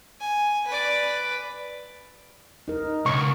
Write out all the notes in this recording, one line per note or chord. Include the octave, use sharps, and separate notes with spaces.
G#5
B4 D5
D#4 A#4
C#2 C#6